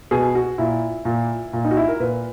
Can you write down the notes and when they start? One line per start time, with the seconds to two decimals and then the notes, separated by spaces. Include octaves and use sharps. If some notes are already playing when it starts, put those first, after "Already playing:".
0.11 B2 G#4
0.35 F#4
0.58 A#2 E4
1.05 A#2
1.53 A#2
1.65 D#4
1.71 F#4
1.77 E4
1.88 A#4
2.00 A#2 B4